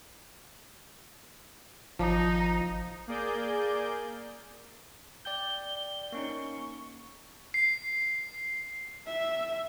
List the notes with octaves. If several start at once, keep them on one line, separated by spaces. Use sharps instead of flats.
G#1 F3 D#4
A#3 G#4 D5 G6
D5 G5 G6 G7
A#3 C#4 D#4 C#6
C7
E5